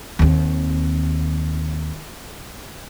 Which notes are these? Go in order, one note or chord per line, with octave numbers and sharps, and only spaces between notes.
D#2 C4